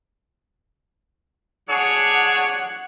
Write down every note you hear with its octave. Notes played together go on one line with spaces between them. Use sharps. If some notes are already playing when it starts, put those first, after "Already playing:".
D4 G#4 C#5 F#5